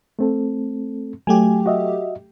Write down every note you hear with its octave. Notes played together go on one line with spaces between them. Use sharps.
A3 C4 A4
F#3 A3 G4 G#5
F#4 D#5 E5